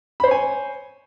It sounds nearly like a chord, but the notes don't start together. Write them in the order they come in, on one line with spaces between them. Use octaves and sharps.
B5 C5 C#5 G#5